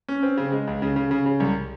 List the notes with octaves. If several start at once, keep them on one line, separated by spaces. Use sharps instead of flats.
C#4
C4
C#3
G#3
C#2
C#3
C#3
C#3
C#3
C2